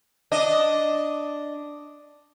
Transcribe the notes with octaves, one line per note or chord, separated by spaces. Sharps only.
D4 D#5